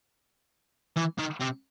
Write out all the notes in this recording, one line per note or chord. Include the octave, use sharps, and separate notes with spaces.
E3
D#3
C3